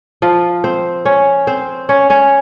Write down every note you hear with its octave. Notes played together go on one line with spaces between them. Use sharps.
F3 F4
C4 C5
C#4 C#5
C4 C5
C#4 C#5
C#4 C#5